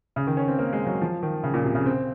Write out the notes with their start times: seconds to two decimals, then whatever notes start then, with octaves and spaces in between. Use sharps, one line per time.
0.16 C#3
0.27 D#3
0.37 C#4
0.48 C4
0.58 A#3
0.73 G#3
0.87 F#3
1.01 F3
1.23 D#3
1.43 C#3
1.54 A#2
1.64 C3
1.75 C#3
1.86 C4